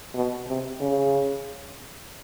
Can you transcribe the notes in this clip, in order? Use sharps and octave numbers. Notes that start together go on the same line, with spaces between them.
B2
C3
C#3